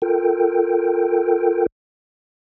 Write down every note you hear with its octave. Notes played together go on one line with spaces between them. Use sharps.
F4 A4 A#4 G5